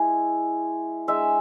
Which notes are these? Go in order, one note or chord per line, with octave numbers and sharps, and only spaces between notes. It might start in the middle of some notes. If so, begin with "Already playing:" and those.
Already playing: G#3 E4 G#5
G#3 D4 E5